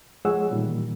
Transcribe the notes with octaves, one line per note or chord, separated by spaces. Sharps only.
F3 G#3 G#4 C#5 F#5 E6
A#2 D#3 E3 G3